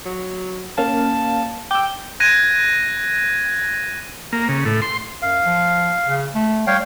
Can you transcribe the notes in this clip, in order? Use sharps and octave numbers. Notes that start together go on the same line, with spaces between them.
F#3
A#3 C#4 F5 A5
G5 D6 E6
F#6 G#6 A#6 D#7
A#3
C#3
A2
C6
F#2 F5
F3
C#3
A3
G3 C#5 F5 G5